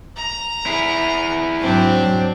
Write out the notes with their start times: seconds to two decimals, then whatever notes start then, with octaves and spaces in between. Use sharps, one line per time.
0.16 A#5
0.66 E4 G#4
1.61 G#2 F#3 C4 D4